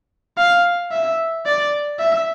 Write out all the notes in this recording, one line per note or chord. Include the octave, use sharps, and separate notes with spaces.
F5
E5
D5
E5